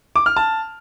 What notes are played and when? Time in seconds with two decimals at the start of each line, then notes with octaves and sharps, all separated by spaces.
0.16 D6
0.26 F6
0.37 A5